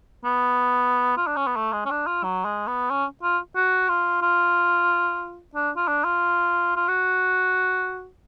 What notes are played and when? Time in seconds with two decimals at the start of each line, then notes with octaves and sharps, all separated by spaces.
0.25 B3
1.17 F4
1.27 D4
1.37 C#4
1.47 B3
1.56 A3
1.73 G#3
1.85 C#4
1.91 D4
2.07 F4
2.24 F#3
2.45 G#3
2.67 B3
2.90 C#4
3.23 F4
3.55 F#4
3.89 F4
4.22 F4
5.55 D4
5.77 F4
5.88 D4
6.04 F4
6.76 F4
6.88 F#4